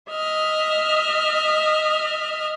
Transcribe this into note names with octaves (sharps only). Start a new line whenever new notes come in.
D#5 E5 F6